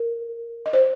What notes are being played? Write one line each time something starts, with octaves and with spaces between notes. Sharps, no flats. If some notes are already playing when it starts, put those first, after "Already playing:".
Already playing: A#4
D#5
C5 D5